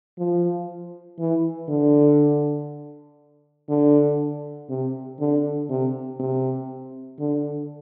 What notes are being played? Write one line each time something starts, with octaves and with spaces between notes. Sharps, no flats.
F3
E3
D3
D3
C3
D3
C3
C3
D3